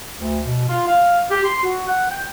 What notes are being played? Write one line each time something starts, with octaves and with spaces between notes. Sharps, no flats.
D2
B2
F4
F5
G4
C6
F#4
F#5
G5